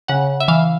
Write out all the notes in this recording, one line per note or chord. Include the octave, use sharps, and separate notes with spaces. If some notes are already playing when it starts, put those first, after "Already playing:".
C#3 F#5
E5
E3 F5